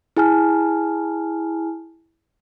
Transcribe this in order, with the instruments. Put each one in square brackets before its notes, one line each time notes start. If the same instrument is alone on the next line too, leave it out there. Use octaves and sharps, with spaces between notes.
[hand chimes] E4 G#4 G#5 A5 F6